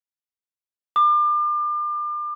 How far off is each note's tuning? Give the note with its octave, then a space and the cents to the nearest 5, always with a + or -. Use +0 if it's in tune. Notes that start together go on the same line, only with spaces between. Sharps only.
D6 +35